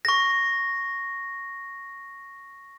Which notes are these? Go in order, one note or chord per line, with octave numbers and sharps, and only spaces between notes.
C#6 A#6